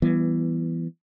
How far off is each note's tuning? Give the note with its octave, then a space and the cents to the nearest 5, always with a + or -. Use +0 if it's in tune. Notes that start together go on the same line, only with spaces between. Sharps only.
E3 +15 G3 -10 B3 +0